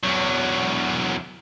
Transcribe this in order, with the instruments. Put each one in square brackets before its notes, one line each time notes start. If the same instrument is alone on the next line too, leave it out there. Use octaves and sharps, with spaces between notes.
[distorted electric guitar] E2 F#3